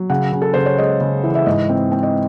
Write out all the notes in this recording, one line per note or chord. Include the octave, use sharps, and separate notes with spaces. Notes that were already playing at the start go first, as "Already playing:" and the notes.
Already playing: F#3
C#3 F#5
C#3
A4
C#3 C5
C#5
G#3 D#5
C#3
E3
E5
G#2 D#5
C4
C4
D#5